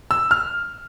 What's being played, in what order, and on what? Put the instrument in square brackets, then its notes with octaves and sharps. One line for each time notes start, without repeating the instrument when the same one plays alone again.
[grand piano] E6
F6